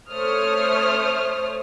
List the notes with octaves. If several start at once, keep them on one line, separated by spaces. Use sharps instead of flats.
A3 C5 C#5 D#6 F6